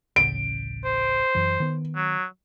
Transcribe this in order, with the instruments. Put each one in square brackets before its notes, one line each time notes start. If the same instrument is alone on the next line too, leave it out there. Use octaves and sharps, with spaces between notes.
[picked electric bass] D1 A1 C#3 [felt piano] D7
[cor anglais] C5
[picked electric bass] F#2 E3
D#3 B3
[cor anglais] F#3